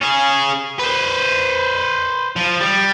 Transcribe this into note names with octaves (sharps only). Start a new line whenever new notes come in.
C#4 G#4
B4 C5
F3
G3